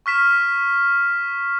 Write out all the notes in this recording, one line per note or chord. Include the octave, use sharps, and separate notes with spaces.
C#6 F6 B6 E7